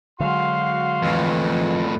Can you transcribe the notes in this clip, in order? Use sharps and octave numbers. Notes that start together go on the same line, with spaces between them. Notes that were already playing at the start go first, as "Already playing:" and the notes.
D3 F#3 G#3 F#4 F5 C6
F2 A2 E3